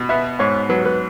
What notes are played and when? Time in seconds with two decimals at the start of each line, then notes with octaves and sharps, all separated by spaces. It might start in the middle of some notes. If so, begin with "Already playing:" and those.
Already playing: B2
0.09 B3 E5
0.39 G#2 C#5
0.69 F#3 B4
0.85 B4